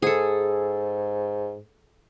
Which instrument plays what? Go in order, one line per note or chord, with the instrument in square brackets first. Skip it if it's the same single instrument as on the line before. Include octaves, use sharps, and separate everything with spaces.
[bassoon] G#2 [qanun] G#4 A4